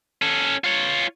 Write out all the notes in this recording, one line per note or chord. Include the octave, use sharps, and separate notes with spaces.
C#4 A4
F4 C#5